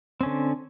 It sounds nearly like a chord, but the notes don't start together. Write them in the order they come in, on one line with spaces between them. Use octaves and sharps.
C4 C#4 D3